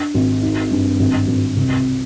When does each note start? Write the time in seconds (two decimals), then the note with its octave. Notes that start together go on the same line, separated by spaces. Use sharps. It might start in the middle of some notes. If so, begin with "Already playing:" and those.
Already playing: D4
0.14 G#1
0.43 D#4
0.71 G2
0.99 G#1
1.28 G#1
1.56 C2